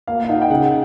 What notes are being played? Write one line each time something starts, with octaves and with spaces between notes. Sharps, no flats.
A#3 F5
F5
D#4 F#5
G5
C#3 F#5